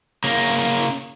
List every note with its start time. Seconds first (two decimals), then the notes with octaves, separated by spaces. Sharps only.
0.24 C#3 A#3